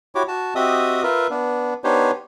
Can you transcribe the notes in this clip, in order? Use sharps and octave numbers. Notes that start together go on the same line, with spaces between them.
E4 F#4 G4 C#5 D6
F#4 A5
C4 F#4 G4 D#5 E5 D#6
F4 A#4 B4 E5
B3 D4
B3 D4 D#4 G4 C5 C#5